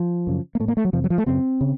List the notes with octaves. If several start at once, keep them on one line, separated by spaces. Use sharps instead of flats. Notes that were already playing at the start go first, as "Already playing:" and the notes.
Already playing: F3
F#2 C#3
A#3
A2 A3
A#3
A3
F#3
F2 C3 F3
F#3
F3
A3
F#2 C#3 C4
C#3